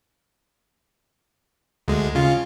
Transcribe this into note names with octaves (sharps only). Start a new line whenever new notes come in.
D2 G#3
C#3 F4